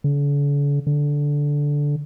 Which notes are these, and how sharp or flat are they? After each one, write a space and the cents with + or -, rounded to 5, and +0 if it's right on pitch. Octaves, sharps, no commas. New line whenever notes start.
D3 -45
D3 -10